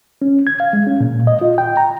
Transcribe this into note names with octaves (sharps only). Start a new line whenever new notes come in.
C#4
G#6
F5
G#3
C#4
A#2
D#5
F4
G5
A#5